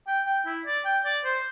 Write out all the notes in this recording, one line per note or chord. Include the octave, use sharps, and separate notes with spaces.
G5
G5
E4
D5
G5
D5
C5